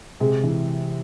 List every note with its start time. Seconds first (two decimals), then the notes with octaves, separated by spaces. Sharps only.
0.20 C3 G#3
0.43 E3